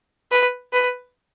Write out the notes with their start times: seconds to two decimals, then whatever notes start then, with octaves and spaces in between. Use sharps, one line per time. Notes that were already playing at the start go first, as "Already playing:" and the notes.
0.32 B4
0.73 B4